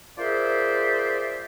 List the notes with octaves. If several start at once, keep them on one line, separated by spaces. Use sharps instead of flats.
F4 G#4 A#4 C5 D5 E5